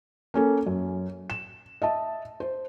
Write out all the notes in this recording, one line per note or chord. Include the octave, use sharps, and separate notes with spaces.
A#3 C#4 A4
F#2
E7
D#5 E5 A5
C5